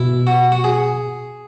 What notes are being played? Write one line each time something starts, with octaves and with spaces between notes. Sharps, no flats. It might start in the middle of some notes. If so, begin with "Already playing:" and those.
Already playing: B2 E4
F#4
F#4
G#4